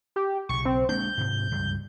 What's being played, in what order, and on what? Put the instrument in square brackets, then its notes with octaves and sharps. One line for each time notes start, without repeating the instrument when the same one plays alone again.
[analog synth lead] G4
[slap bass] B1 C#3 [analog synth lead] C#6
[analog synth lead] C4
[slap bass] G#3 A#3 D4 [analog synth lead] G6
[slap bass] G#2 C3
C#2 G2